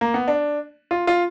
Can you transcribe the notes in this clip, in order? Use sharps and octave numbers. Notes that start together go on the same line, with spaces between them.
A#3
B3
D4
F4
F4